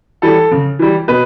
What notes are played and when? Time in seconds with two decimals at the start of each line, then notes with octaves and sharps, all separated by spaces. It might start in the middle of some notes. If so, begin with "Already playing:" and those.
0.22 E3 G3 A4
0.51 C#3
0.79 E3 G3
1.08 B2 B4